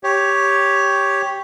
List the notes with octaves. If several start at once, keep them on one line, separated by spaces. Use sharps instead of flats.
G4 C#5